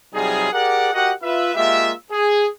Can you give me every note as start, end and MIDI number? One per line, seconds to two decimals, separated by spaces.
0.14 0.49 48
0.14 0.49 54
0.14 0.49 55
0.14 0.49 63
0.14 0.49 65
0.14 0.49 68
0.52 0.90 67
0.52 0.90 68
0.52 0.90 70
0.52 0.90 74
0.52 0.90 78
0.93 1.12 66
0.93 1.12 67
0.93 1.12 70
0.93 1.12 75
0.93 1.12 78
1.23 1.55 65
1.23 1.55 71
1.23 1.55 76
1.55 1.92 56
1.55 1.92 58
1.55 1.92 65
1.55 1.92 67
1.55 1.92 76
2.11 2.47 68